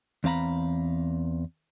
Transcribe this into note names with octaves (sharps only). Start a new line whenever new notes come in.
E2 C4 F5 A#5 B5